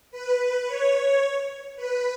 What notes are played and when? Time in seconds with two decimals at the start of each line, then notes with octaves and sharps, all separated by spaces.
0.11 B4
0.66 C#5
1.76 B4